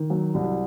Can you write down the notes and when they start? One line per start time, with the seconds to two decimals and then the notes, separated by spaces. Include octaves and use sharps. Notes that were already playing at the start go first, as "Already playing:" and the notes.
Already playing: D#3
0.10 F#3
0.34 C2